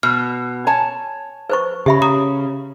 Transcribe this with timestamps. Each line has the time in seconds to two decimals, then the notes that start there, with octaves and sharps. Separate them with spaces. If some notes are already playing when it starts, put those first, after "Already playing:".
0.03 B2 F6
0.67 C#5 G#5 A5
1.50 B4 C5 C#6
1.86 C#3 G4 E5 B5
2.02 A#5 D#6